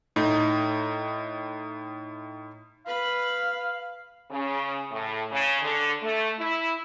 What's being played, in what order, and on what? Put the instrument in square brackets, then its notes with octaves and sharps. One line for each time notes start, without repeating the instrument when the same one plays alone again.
[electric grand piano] A2 D#4
[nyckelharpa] B4 B5 [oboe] F5
[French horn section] C#3
A2
C#3
D3
A3
E4